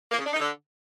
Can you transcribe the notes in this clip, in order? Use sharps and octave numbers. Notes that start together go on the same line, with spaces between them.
A#3
C#3
D4
D#4
D3